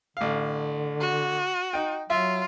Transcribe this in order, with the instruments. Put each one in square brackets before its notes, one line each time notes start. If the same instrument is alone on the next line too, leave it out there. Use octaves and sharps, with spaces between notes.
[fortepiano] A1 F5 [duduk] D3
[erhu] F#4
[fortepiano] D#4 G5
[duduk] F#3 [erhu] F4 [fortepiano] E5